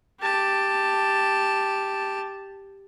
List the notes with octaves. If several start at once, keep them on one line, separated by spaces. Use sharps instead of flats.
G4 A5